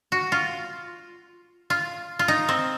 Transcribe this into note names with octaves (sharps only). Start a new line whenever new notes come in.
F#4
F4
F4
F4
D#4
C4